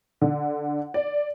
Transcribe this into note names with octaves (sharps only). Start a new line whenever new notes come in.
D3
D5